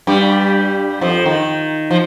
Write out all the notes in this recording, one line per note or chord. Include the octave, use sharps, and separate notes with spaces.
G2 G3
F2 F3
D#3
F3